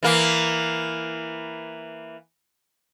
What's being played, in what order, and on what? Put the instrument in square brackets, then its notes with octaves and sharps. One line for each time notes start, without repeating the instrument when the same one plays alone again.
[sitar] E3 A#3